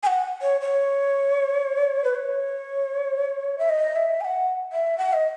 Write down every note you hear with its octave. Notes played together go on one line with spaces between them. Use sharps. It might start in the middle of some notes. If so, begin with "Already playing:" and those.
G#5
F#5
C#5
C#5
B4
C#5
E5
D#5
E5
G#5
F#5
E5
F#5
D#5